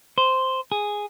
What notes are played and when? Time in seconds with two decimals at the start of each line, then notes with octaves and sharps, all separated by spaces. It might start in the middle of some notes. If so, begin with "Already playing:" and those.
0.18 C5
0.72 G#4